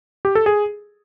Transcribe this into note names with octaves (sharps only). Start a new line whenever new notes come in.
G4
A4
G#4